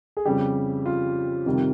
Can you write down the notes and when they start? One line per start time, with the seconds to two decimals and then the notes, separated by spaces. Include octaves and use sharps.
0.17 G#4
0.25 F2 C#3 G3 G4
0.86 F4
1.46 F2 C3 D#3 G3